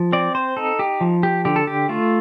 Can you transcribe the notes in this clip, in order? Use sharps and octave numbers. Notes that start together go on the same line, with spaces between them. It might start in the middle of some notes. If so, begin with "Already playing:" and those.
Already playing: F3
C4 D5
C5
D#4 A4
G4
F3
G4
D3 G4
A4
G4
A3 F4